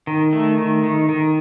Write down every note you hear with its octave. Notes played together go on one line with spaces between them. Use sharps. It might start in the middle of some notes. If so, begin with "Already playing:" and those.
D#3
A3
D#3
D#3
D#3